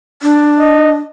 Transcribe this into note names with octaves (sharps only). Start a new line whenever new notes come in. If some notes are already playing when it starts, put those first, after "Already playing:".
D4
D#5